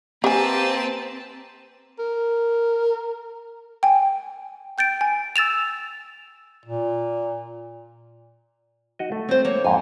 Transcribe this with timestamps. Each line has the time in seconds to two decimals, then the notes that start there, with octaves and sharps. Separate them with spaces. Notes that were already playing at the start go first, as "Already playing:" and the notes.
0.24 A#3 C4 G4 B4 G#5 A5
1.99 A#4
3.83 G5 G#5
4.78 G5 G6 A6 D7
5.01 G#5
5.36 E6 A6 E7 F7
6.66 A#2
8.99 D#4 F#4 D#5
9.12 A3
9.29 C4 C5
9.45 A#3 C#5
9.64 F2 G#2 G#5